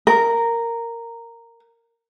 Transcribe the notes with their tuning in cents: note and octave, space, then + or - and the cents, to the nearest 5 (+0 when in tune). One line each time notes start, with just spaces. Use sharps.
A#4 -10